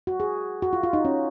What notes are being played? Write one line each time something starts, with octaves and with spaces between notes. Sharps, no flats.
F#4
G#4
F#4
F4
F4
D#4
C#4